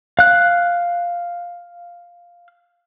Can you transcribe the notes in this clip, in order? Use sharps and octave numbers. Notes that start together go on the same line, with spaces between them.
F5 F#6